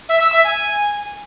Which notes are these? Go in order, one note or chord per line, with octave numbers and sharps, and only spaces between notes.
E5
E6
E5
G#5